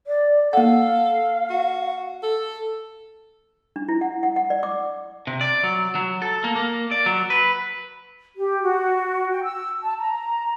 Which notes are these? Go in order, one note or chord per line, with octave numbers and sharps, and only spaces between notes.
D5
A#3 A4 F5 F#5
F#4
A4
D4
E4
F#5
F#5
F#5
D5
D6
C3
D5
F#3
F#3
A4
A#3
A#3
D5
F#3
B4
G4
F#4
G5
E6
A5
A#5